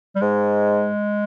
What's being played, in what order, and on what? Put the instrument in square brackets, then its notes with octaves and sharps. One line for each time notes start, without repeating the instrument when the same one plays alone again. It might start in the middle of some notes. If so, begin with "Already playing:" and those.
[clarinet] G3
[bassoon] G#2 [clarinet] G#3